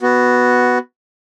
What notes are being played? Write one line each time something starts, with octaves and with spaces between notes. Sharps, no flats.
B3 F#4